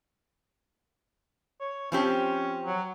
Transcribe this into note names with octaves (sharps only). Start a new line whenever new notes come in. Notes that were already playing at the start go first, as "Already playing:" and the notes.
C#5
F3 C4 C#4 G4
F#3